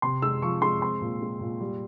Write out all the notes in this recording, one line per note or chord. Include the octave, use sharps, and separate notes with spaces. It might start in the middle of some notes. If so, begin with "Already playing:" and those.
C3 C6
G#3 E6
F3 C#6
G#3 C6
C4 C6
A#2
G#3
A#2
G3